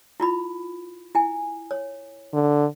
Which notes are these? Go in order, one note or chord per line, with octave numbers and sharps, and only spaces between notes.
E4 F4 B5
E4 G#5
C#5
D3